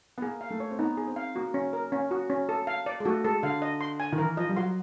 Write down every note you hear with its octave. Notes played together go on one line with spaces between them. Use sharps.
B3
A#3 G#4
F5
A3
C#5
C4
B3 D#4
G#4
C4
F5
A#3 F#4
C#4
A#4
C#4
F#4
C#4
A4
F5
D5
G#3
A3 F#4
G#3 A4
D3 F5
D#5
C6
G#5
D#3
E3 A#4
F3 D#5
G3
F#3 C6